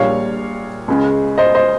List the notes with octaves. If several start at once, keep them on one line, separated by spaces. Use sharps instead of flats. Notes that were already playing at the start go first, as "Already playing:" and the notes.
Already playing: A#1 A#2 G3 C#5 F5
C#2 C#3 G#3
C5 D#5
C5 D#5